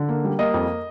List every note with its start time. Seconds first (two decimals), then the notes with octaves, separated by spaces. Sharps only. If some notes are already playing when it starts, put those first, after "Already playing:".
Already playing: D3
0.09 A#3
0.25 G3
0.39 A#3 D#5
0.54 F2